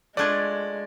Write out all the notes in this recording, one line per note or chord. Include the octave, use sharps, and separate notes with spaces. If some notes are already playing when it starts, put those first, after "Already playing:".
G#3 A3 D4 F4 D5 G#6